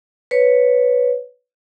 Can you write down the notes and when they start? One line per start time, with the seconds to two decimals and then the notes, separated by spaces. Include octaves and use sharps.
0.31 B4 C#5